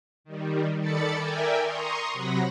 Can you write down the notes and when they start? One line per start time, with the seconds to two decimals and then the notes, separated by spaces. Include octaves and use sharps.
0.24 D#3 G3
0.80 D#3 A4 D5 B5 A6 C#7
1.17 A#4 D5 E5 G5 G#5
1.62 A#5 C6 C#6 D#6
2.13 C3 F#3 F#5 B5 A#6